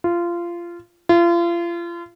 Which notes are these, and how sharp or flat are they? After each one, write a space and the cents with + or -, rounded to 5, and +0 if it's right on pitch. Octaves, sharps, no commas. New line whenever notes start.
F4 -20
F4 -35